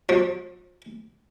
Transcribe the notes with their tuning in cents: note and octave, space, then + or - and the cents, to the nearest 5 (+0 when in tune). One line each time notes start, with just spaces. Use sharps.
F3 +40